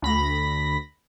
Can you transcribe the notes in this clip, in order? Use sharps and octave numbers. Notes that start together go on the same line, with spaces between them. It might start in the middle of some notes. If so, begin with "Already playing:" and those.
D2 B5 A#6